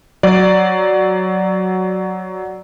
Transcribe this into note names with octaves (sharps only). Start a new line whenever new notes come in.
F#3 D5